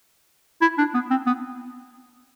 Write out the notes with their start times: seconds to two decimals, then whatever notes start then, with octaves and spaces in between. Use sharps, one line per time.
0.62 E4
0.78 D4
0.94 B3
1.11 C4
1.27 B3